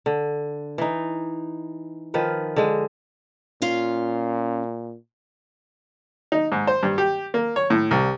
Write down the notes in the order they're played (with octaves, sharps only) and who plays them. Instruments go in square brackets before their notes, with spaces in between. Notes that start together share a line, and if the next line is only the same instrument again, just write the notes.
[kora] D3
E3 D#4
D#3 F3 B4
D3 G#3
[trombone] A#2 [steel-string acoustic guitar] C#4 F4 F5
[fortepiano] D#4
G#2
C5
G2
G4
A#3
C#5
A2
C2